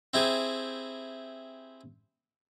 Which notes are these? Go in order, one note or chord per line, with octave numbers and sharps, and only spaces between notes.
C4 E4 G4 G#4